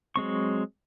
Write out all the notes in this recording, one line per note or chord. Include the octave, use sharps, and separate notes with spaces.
F#3 G#3 C4 C#6